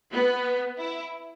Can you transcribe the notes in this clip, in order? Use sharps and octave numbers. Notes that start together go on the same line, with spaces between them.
B3
E4